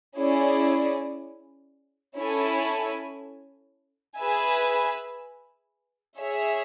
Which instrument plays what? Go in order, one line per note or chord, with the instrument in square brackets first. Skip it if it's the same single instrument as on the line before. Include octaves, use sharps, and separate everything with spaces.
[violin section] C#4 E4 G#4 D5
C#4 E4 A4 C#5 G#5
G#4 B4 E5 G#5
G#4 C#5 E5